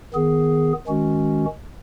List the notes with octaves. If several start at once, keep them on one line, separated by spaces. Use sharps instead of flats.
D#3 B3 G#4
D#3 G#3 C#4 F#4